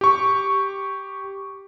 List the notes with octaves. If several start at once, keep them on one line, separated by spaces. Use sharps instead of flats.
G4 C#6